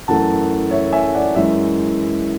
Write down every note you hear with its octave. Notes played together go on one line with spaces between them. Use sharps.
F#2 E3 A3 F#5 A5
C#5 E5
E5 G#5
D5 F#5
F#2 E3 G#3 C#5 E5